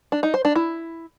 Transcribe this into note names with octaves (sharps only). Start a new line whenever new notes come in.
D4
D#4
C5
D4
E4